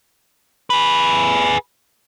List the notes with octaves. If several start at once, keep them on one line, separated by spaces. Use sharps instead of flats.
G#4 B4